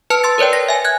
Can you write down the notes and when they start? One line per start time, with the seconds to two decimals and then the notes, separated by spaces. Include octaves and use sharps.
0.10 B4 A5 F6 C#7
0.24 C6 E6 A6
0.38 A#4 B4 C#5 D5 G5
0.53 A#6
0.69 E5 G#5
0.85 F#6 G#6